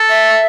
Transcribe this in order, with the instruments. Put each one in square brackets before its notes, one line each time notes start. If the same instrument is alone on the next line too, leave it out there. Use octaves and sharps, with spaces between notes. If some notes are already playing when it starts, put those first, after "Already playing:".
Already playing: [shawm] A4
[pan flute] E5